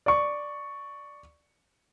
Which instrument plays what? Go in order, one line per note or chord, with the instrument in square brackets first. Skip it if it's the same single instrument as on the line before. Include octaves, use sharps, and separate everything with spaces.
[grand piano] D5 C#6